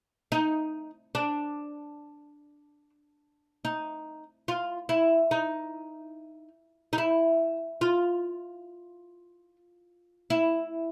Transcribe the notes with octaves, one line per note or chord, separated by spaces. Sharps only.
D#4
D4
D#4
F4
E4
D#4
D#4
E4
F4
E4